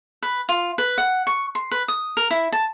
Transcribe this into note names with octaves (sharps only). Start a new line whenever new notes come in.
B4
F4
B4
F#5
C#6
C6
B4
D#6
A#4
E4
A5